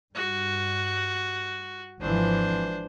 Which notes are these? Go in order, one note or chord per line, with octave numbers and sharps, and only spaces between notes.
G2 F#4
G#1 E3 F3 D4 C5